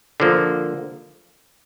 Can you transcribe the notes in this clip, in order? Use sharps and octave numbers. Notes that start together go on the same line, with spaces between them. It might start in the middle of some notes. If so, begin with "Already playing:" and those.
D3 F3 A#3